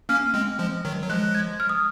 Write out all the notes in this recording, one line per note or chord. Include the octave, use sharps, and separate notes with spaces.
A#3 C#4 F6
G#3 C4
F3 G#3
D#3 F#3
F#3
F3 G#3 F#6
G#6
F6
D#6